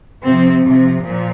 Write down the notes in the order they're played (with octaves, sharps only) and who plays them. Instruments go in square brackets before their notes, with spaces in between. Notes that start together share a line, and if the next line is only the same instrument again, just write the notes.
[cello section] C3 F3 C4
C3 F3
A#2 F3